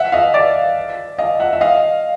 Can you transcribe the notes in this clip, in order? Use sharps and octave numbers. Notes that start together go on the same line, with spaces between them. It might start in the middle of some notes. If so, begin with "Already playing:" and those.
Already playing: E5 F#5
D#5 F5
D5 E5
D#5 F5
E5 F#5
E5
D#5 F5